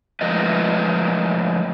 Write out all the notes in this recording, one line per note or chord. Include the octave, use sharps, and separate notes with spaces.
F3 G#3 A3 A#4 B4 D#5